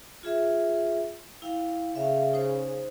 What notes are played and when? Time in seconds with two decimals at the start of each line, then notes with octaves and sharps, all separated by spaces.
0.23 F4 G#4 E5
1.42 E4 F5 G5
1.96 C#3 E5 F5
2.33 D#4 C5